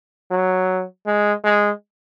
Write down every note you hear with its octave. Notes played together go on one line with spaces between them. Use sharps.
F#3
G#3
G#3